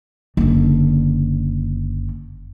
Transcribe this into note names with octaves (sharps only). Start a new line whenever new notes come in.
F#1 D3